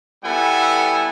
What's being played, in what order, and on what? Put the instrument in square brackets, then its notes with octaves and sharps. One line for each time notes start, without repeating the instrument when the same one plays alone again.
[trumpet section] G3 B3 E4 A4 F#5 G#5